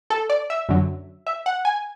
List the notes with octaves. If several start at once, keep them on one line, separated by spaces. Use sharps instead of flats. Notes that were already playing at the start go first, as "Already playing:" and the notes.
A4
D5
E5
F#2 D3 F#3
E5
F#5
G#5